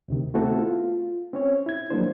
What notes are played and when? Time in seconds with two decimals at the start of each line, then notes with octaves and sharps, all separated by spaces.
0.08 D2 C3 D#3
0.34 A3 B3 C4 E4 F#4 A4
0.58 F4
1.33 C4 C#4 C#5
1.66 E4 G#6
1.90 F3 F#3 G#3 A#3 D4 C5